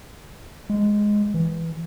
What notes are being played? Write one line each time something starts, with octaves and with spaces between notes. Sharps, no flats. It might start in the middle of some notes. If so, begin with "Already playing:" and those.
G#3
E3